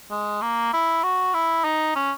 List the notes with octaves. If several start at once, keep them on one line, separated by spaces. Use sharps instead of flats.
G#3
A#3
E4
F#4
E4
D#4
C#4